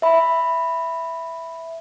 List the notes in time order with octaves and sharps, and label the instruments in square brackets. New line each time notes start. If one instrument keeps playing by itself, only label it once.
[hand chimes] E5 B5